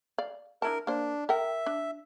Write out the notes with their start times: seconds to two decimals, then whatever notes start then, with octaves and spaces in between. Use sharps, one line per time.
0.18 D5 F5
0.62 D4 E4 A#4 A5
0.87 A#3 D4 C5
1.29 A#4 E5 G5
1.66 D4